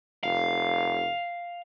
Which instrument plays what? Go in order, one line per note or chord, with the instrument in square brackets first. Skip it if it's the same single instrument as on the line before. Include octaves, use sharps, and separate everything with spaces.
[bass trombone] F1 [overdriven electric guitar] F5